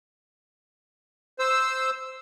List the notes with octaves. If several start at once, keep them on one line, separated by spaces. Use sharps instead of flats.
C5 E6